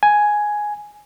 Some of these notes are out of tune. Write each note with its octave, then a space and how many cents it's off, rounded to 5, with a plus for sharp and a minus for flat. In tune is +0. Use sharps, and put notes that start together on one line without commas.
G#5 +5